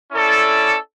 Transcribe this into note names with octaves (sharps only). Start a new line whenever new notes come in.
C#4 E4 A4 D5